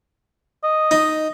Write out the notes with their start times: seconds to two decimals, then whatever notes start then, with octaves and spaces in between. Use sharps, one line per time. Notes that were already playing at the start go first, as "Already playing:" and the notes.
0.63 D#5
0.91 D#4